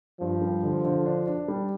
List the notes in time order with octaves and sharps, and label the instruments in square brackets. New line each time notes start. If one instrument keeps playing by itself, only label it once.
[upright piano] G2 [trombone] F3
[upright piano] G3
D3
D3
D4
D4
G3